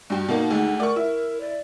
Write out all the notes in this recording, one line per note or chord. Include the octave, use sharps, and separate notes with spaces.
G2 F#4 G5
B2 A#3 D#4
D2 G#3
A#4 D5 C#6
E4
D5